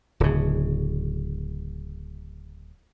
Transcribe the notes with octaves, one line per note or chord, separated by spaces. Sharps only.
D1 C#3